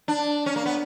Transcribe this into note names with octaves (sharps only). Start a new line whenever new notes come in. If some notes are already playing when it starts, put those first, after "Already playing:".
D4
C#4
A#3
B3